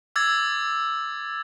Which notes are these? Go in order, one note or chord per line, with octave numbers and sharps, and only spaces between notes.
D6 E6 G#6 A6